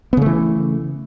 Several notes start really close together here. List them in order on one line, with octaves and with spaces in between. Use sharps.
B3 C#3 A3 E3